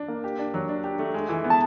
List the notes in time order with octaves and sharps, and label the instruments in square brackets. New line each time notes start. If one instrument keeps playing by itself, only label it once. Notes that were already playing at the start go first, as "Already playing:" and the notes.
Already playing: [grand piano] D4
A#3
G4
D4
F#3
D4
G4
A3
G#3
E3
B3
[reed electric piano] A5